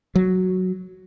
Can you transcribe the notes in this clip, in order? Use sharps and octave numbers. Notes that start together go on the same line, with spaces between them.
F#3